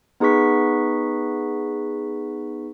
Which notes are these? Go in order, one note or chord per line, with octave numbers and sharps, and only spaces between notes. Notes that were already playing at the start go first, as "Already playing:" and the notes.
B3 D#4 G#4 B4 C#6 B6